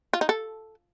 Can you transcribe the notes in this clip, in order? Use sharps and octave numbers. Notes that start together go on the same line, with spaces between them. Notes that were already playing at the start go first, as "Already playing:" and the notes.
F4
D#4
A4